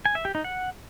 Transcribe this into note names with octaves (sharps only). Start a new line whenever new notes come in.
G#5
E5
G4
D#4
F#5